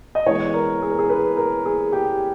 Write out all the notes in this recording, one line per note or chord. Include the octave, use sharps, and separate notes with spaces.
D#5
E3 G#3 B3 C#5
A#4
G#4
A#4
G#4
B4
A#4
G#4
G4